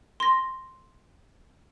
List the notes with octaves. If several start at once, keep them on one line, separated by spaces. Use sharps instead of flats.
C6 A#6